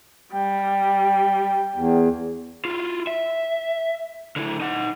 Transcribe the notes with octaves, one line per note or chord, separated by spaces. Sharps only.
G3 G5
E2
E4 F4
E5
D3 E4
D#4 F#5